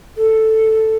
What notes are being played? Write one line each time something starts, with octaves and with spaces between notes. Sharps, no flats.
A4